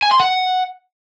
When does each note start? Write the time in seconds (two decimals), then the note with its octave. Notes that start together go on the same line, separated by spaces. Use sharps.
0.03 G#5
0.11 C6
0.20 F#5